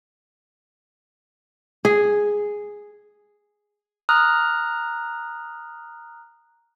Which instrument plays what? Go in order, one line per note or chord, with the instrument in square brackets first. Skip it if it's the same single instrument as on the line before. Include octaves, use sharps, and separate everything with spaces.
[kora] G#4
[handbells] A#5 D#6 F6 F#6